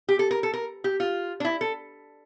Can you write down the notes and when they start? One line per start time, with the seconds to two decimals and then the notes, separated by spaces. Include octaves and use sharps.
0.09 G4
0.19 A4
0.31 A#4
0.43 A4
0.54 A#4
0.84 G4
1.00 F4
1.40 D4
1.45 E4
1.61 A4